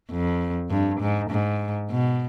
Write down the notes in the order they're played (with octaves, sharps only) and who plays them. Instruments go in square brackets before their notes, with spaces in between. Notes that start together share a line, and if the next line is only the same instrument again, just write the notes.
[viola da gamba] F2
G2
G#2
G#2
B2